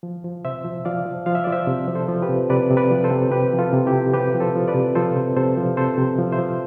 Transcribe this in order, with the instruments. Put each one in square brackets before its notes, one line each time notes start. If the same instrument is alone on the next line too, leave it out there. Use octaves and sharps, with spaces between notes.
[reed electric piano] F3
F3
C3 C5 E5
F3
F3 D5 F5
F3
F3 F5
E5
F3 D5
C5 E5
C3
F3
A4 C5
F3
G4 B4
C3
C3 B4 D5
C3
B4 D5
F3
A4 C5
C3
C3 G4 B4
F3
F4 A4
C3
E4 G4
C3
C3 G4 B4
F3
A4 C5
F3
B4 D5
C3
F3 A4 C5
C3
C3 A4 C5
F3
C3 A4 C5
C3
F3
C5 E5
F3